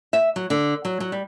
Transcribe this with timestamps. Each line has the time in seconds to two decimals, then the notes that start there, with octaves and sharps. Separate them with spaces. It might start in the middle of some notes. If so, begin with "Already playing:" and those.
0.13 E5
0.36 F#3
0.50 D3
0.85 F#3
1.00 F#3
1.12 G3